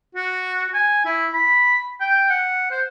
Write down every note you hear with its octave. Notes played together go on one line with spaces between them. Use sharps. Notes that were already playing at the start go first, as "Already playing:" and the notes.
F#4
G#5
E4
B5
G5
F#5
C5